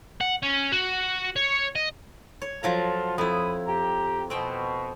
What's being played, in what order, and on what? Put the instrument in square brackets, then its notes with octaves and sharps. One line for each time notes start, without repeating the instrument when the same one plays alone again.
[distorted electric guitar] F#5
C#4
F#4
C#5
D#5
[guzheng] C#5
[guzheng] F3 F#3 A#5 [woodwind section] F4 A4
[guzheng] F2 E4 [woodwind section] B5 D#6
[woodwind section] G4 A#5
[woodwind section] B2 [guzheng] C4 G5